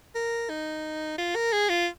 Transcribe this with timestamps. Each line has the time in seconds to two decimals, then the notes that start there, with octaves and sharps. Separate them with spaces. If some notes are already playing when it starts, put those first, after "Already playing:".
0.15 A#4
0.50 D#4
1.18 F4
1.35 A#4
1.53 G#4
1.69 F4